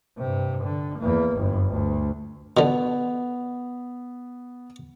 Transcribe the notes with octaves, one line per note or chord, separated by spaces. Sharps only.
G2 C3
D3
E2 A#3
G1 F#2
D2
B2 D3 B3